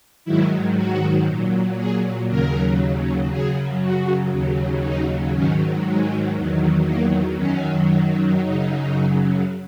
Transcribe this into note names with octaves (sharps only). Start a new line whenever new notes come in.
G#2 D#3 F#3 E4
F#4
A#2 F#3
G#4
D#2 C#3 F#3 A#4
F#2 C#3 F#3 G#4
F#4
D#2 C#3 F#3
D#4
G#2 D#3 F#3 C#4
G#3
E2 D#3 F#3
A#3
F#2 D#3 F#3 C#4
F#2 C#3 F#3 D#4